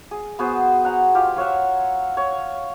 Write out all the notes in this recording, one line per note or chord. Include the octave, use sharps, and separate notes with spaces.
G#4
B3 F#4 G#4 C5
F#5 A#5
F4 G4
F4 C#5 E5 F#5
C#5